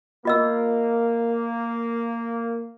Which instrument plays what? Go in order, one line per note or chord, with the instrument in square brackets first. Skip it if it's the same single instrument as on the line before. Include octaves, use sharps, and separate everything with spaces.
[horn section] A#3 [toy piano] F4 D#5 E6